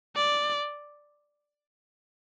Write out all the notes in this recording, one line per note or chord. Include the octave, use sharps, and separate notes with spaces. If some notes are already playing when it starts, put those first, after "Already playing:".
D5